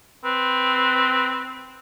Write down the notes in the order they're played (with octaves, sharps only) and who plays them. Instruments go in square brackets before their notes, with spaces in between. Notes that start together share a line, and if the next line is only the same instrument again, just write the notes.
[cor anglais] C4 [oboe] B4